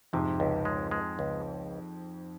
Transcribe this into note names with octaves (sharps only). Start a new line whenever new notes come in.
F2 G#2 C3
C#2
G#3
G#3
C#2